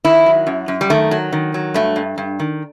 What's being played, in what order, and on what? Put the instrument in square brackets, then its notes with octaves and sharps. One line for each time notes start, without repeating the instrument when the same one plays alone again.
[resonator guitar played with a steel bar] D#3 E4
F#3
F#2
F#2
G3
D#3 A3
F#3
D#3
F#3
G2 A3
G2
G2
D#3